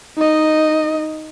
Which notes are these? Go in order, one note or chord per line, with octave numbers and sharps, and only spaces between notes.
D#4 D#5